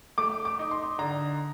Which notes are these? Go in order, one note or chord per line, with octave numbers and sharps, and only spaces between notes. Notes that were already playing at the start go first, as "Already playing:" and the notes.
A3 D6
D6
D#4
C6
D3 A#5